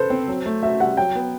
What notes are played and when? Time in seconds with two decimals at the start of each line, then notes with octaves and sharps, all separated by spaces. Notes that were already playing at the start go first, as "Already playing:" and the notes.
Already playing: A4 B4 C5
0.10 C4
0.28 F#3
0.46 A3
0.63 F#4 E5
0.80 G3 F#5
0.97 F#3 G5
1.15 B3